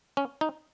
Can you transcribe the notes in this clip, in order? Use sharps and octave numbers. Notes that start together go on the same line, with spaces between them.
C#4
D#4